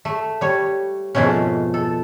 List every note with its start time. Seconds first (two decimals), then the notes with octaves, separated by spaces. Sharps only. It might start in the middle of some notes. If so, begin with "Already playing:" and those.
0.05 A3
0.41 G3 C#5
1.15 F2 G#2 B2 A3 C#4
1.74 A4